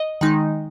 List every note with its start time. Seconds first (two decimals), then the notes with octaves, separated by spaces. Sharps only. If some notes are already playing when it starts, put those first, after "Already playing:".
Already playing: D#5
0.21 D#3 G#3 D#4